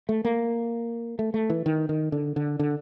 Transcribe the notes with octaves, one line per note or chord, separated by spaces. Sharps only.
A3
A#3
A3
A3
E3
D#3
D#3
D3
D3
D3